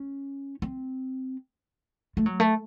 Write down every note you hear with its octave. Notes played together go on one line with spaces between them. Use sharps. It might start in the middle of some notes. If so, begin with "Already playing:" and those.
Already playing: C#4
C4
A3
F#3
A3